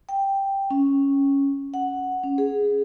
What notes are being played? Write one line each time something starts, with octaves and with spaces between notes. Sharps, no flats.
G5
C#4
F#5
C#4
G#4